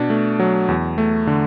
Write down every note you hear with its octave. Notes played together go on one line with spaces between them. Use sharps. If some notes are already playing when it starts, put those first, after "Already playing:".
Already playing: B2 D4
A3
F#3
E2
A3
D3